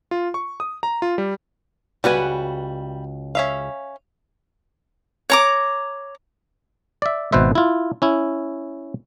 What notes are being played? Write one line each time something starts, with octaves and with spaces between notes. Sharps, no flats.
F4
C#6
D#6
A#5
F4
G3
C#2 G3 F#4 B4 G#5
C#4 E5 F5
C#5 A#5 D6
D5 E5
G#1 B2 B4 C5 E5
E4 F4
C#4 E4